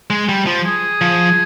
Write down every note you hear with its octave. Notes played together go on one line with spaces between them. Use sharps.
G#3
G3
F3
G#4
F3